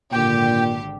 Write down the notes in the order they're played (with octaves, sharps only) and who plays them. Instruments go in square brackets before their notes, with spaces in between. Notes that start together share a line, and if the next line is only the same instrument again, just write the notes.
[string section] G#1 D3 G4 [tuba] A#2 [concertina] G5